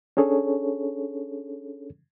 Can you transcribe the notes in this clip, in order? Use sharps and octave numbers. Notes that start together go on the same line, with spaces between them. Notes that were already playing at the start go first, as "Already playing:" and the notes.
C#4 D4 G#4 A4 C#5